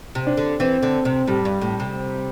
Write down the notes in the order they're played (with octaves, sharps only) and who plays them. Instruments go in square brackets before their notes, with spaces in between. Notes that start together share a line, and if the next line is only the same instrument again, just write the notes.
[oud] C3
[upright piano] D4
[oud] D3
[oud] E3 [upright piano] C4
[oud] D3
C3
[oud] A2 [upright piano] G3
[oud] G2
A2
C3